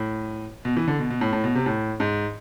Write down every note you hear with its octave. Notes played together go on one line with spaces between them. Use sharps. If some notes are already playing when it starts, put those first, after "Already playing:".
Already playing: A2
B2
E3
D3
B2
B2
A2
A2
B2
C3
A2
G#2